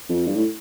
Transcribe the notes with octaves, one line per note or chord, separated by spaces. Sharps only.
F2
G2
A2